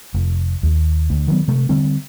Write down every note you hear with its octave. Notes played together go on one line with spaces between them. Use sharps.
F1
D#2
D2
D#3 F#3 B3
C3 A3
D3 G3 C4